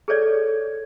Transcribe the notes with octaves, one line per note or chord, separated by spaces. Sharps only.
G#4 A4 C#5 D5